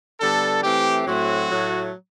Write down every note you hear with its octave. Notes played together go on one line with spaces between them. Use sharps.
D3 G3 B3 A4
E3 A3 C4 G4
A2 F#3 A3 C4 F#4
A2 F#3 A3